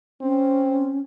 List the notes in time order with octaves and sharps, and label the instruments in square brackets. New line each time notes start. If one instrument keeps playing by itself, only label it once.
[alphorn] C4 [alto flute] C#4